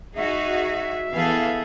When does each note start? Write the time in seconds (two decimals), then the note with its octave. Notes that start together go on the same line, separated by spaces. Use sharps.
0.16 D#4 F#4 G#4 E5
1.13 E3 B3 G#4 A4 F5